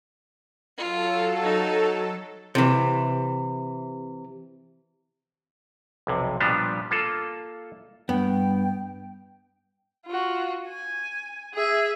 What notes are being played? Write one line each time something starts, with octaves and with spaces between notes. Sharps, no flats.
F#3 F4 A4
D#4
C3 E3
B1 F2 C3
A#2 F3 G3 B3 D4 G4
A#3 F4 A4
G2 B3 G5
F4 F#4
G#5
G#4 E5